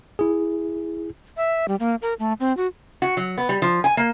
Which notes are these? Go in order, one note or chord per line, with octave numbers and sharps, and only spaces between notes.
E4 G#4
E5
G3
A#3
A#4
A3
C4
F#4
F#4
F#3
B3
G3
F3
G#5
A#3